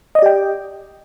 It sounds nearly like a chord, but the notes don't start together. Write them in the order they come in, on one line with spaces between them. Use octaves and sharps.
D#5 D5 G4 G5